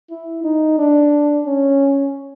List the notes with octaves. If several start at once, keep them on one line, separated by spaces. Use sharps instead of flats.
E4
D#4
D4
C#4